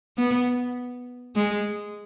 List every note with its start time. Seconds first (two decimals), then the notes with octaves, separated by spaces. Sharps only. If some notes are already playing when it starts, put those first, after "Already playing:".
0.17 B3
1.36 G#3